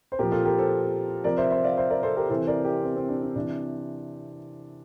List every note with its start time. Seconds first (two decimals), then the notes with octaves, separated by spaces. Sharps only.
0.12 C5
0.19 A#2 F3 G4 A#4
0.32 F4 A4
0.45 G4 A#4
0.58 A4 C5
1.24 C3 F3 A#4 D5
1.37 C5 E5
1.50 C5 E5
1.64 D5 F5
1.77 C5 E5
1.90 A#4 D5
2.03 A4 C5
2.16 G4 A#4
2.29 C3 E3 A4 C5
2.47 A#4 D5
2.64 G4 A#4
2.83 C4
2.96 C4
3.09 D4
3.23 D4
3.36 C3 E3 D4